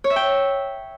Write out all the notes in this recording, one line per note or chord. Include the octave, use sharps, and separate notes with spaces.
C#5
E5
G5